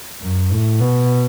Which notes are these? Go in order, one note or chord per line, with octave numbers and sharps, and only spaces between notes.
F#2
A2
B2